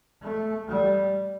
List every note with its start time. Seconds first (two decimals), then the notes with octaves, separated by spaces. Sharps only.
0.22 A3
0.68 G3